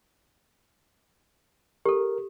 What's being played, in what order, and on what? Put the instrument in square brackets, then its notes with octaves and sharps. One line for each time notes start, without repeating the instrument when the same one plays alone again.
[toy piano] G4 A4 [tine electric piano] A#4